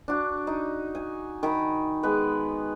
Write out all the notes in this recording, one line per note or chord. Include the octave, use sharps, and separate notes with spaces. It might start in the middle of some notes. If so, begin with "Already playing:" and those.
D4 F#4
D#4
G#5
D#3 B5
G#3 B3 B4